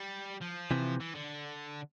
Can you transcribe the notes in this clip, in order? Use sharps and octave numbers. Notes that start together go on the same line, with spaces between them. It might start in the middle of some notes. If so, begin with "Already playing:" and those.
Already playing: G3
F3
C3 E3
E3
D3